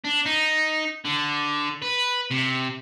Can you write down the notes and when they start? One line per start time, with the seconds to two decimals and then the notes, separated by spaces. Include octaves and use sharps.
0.05 D4
0.26 D#4
1.05 D3
1.82 B4
2.31 C3